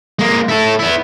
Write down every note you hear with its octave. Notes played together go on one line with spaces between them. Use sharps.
G#3 A#3
E4 A4
B3 E4